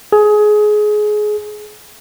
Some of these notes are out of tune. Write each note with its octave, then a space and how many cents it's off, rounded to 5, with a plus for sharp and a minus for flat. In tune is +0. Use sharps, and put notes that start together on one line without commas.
G#4 +20